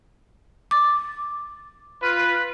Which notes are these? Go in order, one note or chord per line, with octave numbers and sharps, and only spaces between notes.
D6 A6
F4 B4